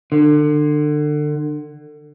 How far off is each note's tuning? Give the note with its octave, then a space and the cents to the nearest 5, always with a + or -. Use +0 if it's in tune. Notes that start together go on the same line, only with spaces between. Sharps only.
D3 +30